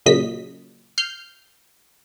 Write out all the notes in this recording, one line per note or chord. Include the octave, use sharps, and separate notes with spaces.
A#2 C#3 F#3 D#5 B6
F6 G6 C7